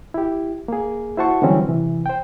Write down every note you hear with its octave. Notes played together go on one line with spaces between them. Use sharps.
E4 G4
A#3 G#4
E4 F#4 C5 F#5 A5 C#6
D3 E3 F#3 G3 C4 C#4
C3 E3
C5 G5